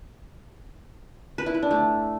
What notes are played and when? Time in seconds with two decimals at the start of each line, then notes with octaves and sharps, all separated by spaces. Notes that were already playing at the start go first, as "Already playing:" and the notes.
1.38 B4
1.46 E4
1.54 B4
1.63 D4
1.71 A3